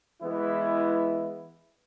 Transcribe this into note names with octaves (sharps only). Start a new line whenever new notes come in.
E3 G#3 B3 E4